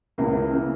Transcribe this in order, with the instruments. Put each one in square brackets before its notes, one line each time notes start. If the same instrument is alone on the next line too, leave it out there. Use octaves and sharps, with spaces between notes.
[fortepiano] C#2 C#3 E3 A#3
C#3 E3